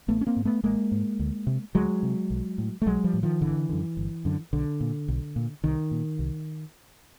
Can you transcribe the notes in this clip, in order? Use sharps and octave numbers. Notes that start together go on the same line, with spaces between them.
A1 A3 B3
C#4
A#3 C4
G#2
A3 B3
A1 G#3 A#3
G#2
D2
C3
D2 F#3 G#3
C3
B1
A2
A3
B1 F#3 G#3
F3 G3
A2
D#3 F3
G1 D3 E3
F#2 D3
G1
F#2 D3
B1 D3
A#2
B1
A#2
C2 D#3
A#2
C2